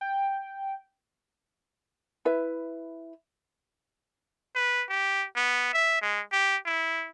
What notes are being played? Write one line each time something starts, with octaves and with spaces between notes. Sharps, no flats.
G5
E4 B4 E5
B4
G4
B3
E5
G#3
G4
E4